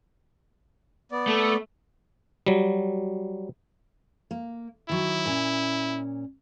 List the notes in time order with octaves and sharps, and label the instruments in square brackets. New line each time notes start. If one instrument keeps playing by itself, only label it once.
[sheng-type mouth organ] B3 D5
[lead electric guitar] A3
[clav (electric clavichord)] F#3 G3
[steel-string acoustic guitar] A#3
[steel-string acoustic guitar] D#3 F#3 [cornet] E4
[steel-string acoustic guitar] A#2 C#4